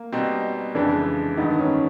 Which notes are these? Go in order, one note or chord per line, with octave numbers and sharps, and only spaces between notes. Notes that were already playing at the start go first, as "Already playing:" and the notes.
Already playing: A#3
B2 G3 C4 D#4
F2 C#3 E3 G#3 D4
G2 D#3 G#3 B3 D#4
C#4